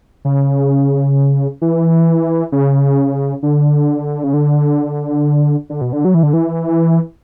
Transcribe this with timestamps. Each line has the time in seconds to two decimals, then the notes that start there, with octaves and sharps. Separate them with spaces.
0.25 C#3
1.62 E3
2.52 C#3
3.43 D3
4.24 C#3
4.34 D3
5.70 D3
5.81 B2
5.93 D3
6.05 F#3
6.14 E3
6.23 D3
6.33 E3